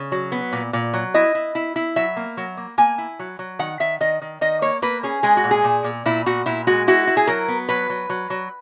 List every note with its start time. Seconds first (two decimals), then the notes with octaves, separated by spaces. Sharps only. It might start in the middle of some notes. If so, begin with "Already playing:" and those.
Already playing: C#3
0.12 F#3
0.32 B3
0.53 A#2
0.73 A#2
0.94 F#3
1.14 E4 D#5
1.35 E4
1.55 E4
1.76 E4
1.96 F#3 E5
2.17 A#3
2.37 F#3
2.57 A#3
2.78 A#3 G#5
2.98 E4
3.19 F#3
3.39 F#3
3.59 D#3 F#5
3.80 D#3 E5
4.01 D#3 D#5
4.22 D#3
4.41 D#3 D#5
4.62 A#3 C#5
4.82 A#3 B4
5.03 C#4 G#4
5.23 G#3 G#4
5.37 F#4
5.44 A#2
5.51 G#4
5.64 A#2
5.84 A#2
6.06 A#2 E4
6.26 A#2 F#4
6.46 A#2 E4
6.67 G#3 F#4
6.88 E4 F#4
7.07 E4
7.17 G#4
7.27 F#3 A#4
7.48 B3
7.69 F#3 B4
7.90 F#3
8.10 F#3
8.30 F#3